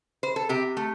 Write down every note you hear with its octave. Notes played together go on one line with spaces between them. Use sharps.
C5
A4
C3 G4
A3